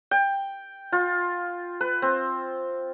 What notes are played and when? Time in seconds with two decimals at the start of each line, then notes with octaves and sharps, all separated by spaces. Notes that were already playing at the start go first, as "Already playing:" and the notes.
0.11 G5
0.92 F4
1.81 B4
2.02 C4